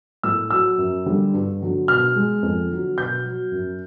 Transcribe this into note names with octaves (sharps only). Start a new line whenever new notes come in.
A2 E6
F#3 E6
F#2
D3 G3
G2
D3 F#3
B2 F6
G#3
F2
D3 F#3
B2 G6
F#3
F#2